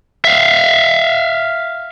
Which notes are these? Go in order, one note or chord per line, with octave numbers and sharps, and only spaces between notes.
E5 F5